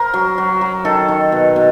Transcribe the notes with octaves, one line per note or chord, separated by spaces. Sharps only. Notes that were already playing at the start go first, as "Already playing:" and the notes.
Already playing: A#4 C5
F#3
F#3
F#3
D#3 A4
D#3
B2
B2